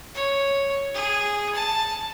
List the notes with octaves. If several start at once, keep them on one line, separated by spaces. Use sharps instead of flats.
C#5
G#4
A5